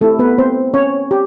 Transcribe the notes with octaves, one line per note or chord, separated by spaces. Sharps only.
A3 C4 E4 G4 A4
B3 B4
C4 C5
C#4 C#5
G4